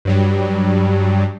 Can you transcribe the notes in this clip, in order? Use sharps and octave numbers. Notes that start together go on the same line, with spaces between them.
G2 F#3 G3